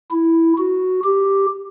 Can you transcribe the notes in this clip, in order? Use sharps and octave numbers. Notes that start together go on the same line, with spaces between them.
E4
F#4
G4